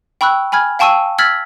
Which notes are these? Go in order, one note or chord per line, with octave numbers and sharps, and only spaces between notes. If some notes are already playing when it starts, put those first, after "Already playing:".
G5 B5 C#6 E6 F#6
G#5 B5 F6 G#6
F5 G5 A5 C#6 E6 D#7
E6 F6 G#6 A6 B6 F#7